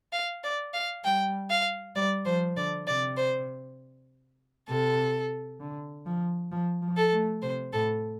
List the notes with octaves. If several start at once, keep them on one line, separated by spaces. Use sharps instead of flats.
F5
D5
F5
G3 G5
F5
G3 D5
F3 C5
D3 D5
C3 D5
C5
C3 A4
D3
F3
F3
F3
A4
A3
C3 C5
A2 A4